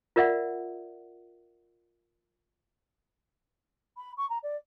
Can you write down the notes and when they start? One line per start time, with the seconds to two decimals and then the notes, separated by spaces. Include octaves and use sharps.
0.16 F4 A#4 D5 E5 F#5
3.97 B5
4.17 C#6
4.29 A#5
4.43 D5